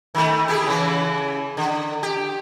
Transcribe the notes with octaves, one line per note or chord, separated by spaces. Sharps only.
D#3 A3
E4 G4 G#4
C#3 E3
D3
G4